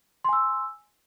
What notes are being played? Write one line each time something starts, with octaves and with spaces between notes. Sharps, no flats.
G#5 C6 E6